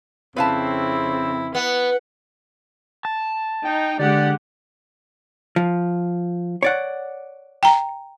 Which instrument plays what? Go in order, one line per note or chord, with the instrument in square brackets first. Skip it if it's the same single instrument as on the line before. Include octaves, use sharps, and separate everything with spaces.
[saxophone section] F2 C#3 C4 [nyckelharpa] E4 [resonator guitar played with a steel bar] B4 F5 A5
[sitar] B3 [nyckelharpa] F#5
[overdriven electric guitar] A5
[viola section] D#4 [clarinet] G5
[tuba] D3 [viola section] G#3 G4 F#5 [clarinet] D5
[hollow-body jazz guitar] F3
C#5 D5 F#5
[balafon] G5 A#5